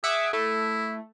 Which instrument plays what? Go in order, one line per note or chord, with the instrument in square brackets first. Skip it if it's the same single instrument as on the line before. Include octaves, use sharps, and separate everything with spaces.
[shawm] G#4 [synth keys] E5 F#5 D6
[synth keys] A3 [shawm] E4